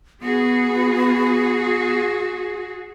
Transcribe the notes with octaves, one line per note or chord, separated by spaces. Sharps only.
B3 F#4 G#4